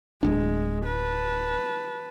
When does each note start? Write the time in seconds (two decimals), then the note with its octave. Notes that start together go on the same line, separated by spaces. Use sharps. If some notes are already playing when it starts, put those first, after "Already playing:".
0.23 D1 G1 G#3 D4
0.86 B4 A5